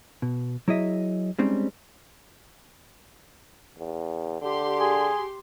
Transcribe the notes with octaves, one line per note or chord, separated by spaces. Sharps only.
B2
F#3 E4 G#4 D#5 E5
G3 G#3 C4 C#4 D#4
E2
D3 G4 C6
G#4